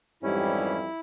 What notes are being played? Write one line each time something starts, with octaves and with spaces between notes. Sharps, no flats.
F2 G#2 E3 G3 C#4 E4